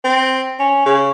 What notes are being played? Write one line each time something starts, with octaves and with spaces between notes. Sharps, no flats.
C4
C#4
C#3